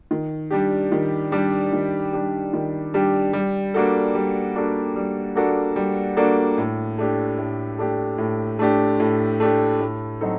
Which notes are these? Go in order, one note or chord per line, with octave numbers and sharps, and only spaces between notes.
D#3
G3 D4 G4
D#3
G3 D4 G4
D#3
G3 D4 G4
D#3
G3 D4 G4
G3
A#3 D4 F#4 A4
G3
A#3 D4 F#4 A4
G3
A#3 D4 F#4 A4
G3
A#3 D4 F#4 A4
A2
A3 D4 G4
A2
A3 D4 G4
A2
A3 D4 G4
A2
A3 D4 G4
A2
F#3 C4 D#4 A4